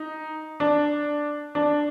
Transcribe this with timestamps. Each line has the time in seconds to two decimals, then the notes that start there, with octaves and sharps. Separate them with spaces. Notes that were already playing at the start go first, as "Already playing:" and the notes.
Already playing: D#4
0.60 D4
1.55 D4